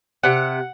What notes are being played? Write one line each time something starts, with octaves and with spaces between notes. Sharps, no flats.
C3 F#5